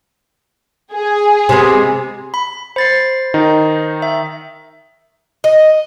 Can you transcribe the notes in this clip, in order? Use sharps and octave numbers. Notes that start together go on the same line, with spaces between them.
G#4
C3 G#3 B3
B5
C5 B5 A6 C7
D#3 D#4
E5
D#5